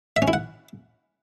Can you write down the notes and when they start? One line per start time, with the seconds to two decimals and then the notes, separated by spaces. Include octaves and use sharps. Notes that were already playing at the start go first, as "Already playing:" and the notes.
0.16 E5
0.22 C#4
0.28 E4
0.33 F#5